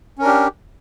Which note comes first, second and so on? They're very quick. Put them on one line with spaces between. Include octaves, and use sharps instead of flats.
C#4 A#4 D4 G4